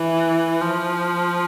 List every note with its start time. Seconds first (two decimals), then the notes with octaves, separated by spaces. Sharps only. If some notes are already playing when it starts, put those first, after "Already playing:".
Already playing: E3
0.61 F3